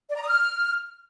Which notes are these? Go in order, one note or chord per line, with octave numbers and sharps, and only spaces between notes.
D5
A#5
D#6
F6